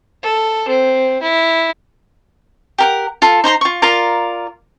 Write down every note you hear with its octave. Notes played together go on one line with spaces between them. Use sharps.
A4
C4
E4
G4 A#4 F#5
F4 A4
D#4 C5 A#5 C6
F4 C#6
F4 A#4 D5 A#5